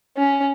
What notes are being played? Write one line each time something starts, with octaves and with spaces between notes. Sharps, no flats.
C#4